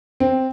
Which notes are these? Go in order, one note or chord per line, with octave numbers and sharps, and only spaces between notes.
C4